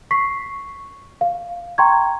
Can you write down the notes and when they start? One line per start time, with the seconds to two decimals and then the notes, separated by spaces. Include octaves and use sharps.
0.11 C#6 B6 C7
1.21 F5
1.78 G5 A#5 C6 C#6 G#6